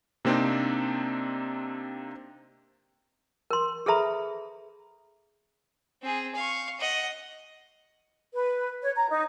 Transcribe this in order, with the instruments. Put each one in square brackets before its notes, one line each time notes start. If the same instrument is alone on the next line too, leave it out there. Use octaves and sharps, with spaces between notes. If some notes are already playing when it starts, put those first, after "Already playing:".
[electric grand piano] C3 A#3 C4 D4 D#4
[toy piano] A#4 C6
G#4 A4 B4 E5 A#5 B5
[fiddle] C4 G#4
F5 C#6
D#5 F#5
[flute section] B4
C#5
A#5
D#4